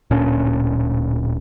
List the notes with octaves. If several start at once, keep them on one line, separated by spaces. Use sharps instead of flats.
D1 A#2 C#4 D4